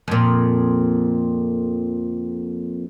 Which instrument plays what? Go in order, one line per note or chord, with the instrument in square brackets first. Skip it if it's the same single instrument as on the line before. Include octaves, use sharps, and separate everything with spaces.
[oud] F2 A#2